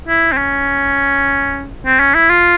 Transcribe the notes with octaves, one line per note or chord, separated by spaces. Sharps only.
E4
C4
C#4
C4
C#4
E4
F4